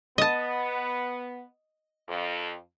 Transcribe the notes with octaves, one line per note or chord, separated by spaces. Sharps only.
B3 D#5 A5
F2